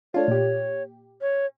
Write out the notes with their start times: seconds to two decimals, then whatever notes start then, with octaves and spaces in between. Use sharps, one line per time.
0.14 A3 D4 F4 C#5
0.28 A#2 G4
1.21 C#5